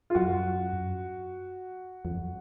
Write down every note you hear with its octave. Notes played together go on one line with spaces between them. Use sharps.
F4
F#2 F#4
F2